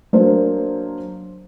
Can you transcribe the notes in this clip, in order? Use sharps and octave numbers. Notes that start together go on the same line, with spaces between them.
F#3 A#3 D4 C5